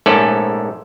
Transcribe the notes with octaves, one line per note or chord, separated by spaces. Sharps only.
A#1 G#2 A3 C#4 A4 D5